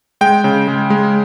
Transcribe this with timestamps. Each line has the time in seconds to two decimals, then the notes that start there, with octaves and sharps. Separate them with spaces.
0.21 G#3 G5
0.44 C#3
0.68 G#3
0.90 G#3